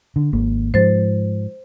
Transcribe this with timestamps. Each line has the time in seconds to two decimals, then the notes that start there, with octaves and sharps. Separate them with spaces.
0.16 D3
0.33 G#1 A#3
0.74 G#2 F3 C5 A6